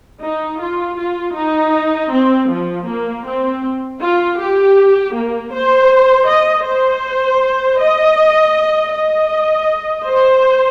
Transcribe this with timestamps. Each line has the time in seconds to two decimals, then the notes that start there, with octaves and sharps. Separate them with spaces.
0.21 D#4
0.60 F4
0.98 F4
1.35 D#4
2.11 C4
2.49 F3
2.87 A#3
3.25 C4
4.01 F4
4.38 G4
5.14 A#3
5.52 C5
6.28 D#5
6.65 C5
7.80 D#5
8.93 D#5
10.07 C5